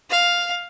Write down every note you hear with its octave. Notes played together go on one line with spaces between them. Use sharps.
F5